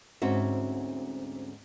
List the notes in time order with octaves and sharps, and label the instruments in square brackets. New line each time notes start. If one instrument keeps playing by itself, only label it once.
[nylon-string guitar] D2 G#2 C4 C#4 F#4 E5